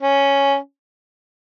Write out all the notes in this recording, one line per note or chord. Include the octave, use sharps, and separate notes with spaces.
C#4